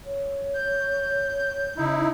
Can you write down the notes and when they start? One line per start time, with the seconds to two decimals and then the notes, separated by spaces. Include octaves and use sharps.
0.05 C#5
0.54 G6
1.77 C#3 D#4 E4